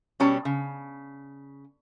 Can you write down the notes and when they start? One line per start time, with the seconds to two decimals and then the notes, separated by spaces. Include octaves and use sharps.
0.20 B2 G3 C#4 C#5 A5
0.45 C#3